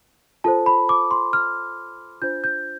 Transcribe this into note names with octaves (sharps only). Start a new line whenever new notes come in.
F4 A4 C5 A5
B5
D6
C6
F6
D4 F4 C5 G6
G6